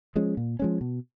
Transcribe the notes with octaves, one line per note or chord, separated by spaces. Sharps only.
F3 G#3 C#4
A#2
F3 G#3 C#4
B2